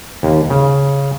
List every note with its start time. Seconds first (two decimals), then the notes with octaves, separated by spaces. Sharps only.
0.23 D#2
0.50 C#3